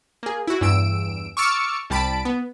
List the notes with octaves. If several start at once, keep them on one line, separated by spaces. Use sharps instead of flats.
A#3 G#4
E4 F#4
E2 G2 E3 E6 D7
C#6 D6 E6 F6 A6 C#7
C2 G3 A5 B5 D7
B3